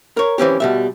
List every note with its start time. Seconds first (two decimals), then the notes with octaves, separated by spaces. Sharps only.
0.17 A#4 C#5
0.38 E3 C4 C#4 G4
0.60 B2 G3 E5